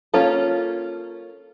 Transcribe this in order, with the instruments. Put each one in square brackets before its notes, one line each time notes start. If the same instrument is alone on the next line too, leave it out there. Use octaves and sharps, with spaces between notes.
[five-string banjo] A#3 C#4 F4 A4